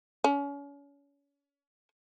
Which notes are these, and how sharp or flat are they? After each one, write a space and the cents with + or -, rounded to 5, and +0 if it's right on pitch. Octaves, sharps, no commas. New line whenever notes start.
C#4 +35